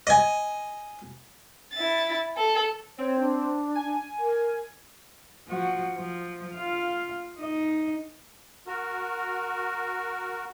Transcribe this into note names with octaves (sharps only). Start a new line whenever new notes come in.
D#5 G#5
E4 A6
A4
C4 C#5
D4
G#5
A#4
F3 F#4
F3
F4 F5
D#4 D#5
F#4 A#4